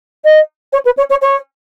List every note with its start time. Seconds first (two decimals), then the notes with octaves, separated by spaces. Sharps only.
0.24 D#5
0.72 C#5
0.85 B4
0.97 C#5
1.09 C#5
1.21 C#5